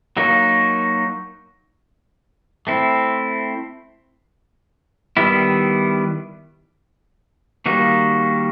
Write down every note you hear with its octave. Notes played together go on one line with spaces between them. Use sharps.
F#3 A#3 D#4 F#4
A3 C4 E4
D#3 G3 B3 E4
D#3 G3 A#3 D#4 F#4